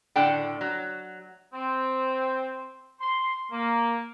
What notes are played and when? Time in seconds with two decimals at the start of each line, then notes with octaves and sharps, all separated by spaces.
0.16 A2 D3 A4 D5 F#5 G5
0.61 F#3
1.54 C4
3.01 C6
3.52 A#3